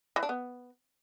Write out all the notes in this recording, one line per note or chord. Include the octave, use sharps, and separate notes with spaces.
E3
D4
B3